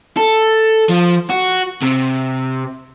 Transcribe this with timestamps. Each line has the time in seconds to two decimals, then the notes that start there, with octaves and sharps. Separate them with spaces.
0.17 A4
0.89 F3
1.30 F#4
1.82 C3